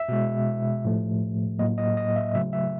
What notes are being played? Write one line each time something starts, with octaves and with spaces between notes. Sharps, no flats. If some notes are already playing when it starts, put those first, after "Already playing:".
Already playing: E5
B2 G#3
A2 F3 A3
A2 F#3 A#3 D#5
D#5
D#5
E5
C#3 F#3 A3 E5
E5